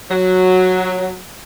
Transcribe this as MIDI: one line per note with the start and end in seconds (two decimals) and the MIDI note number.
0.09 1.18 54